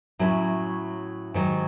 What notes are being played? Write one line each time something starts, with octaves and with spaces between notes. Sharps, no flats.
A2 F#3 C#4 E4
G#2 D#3 F#3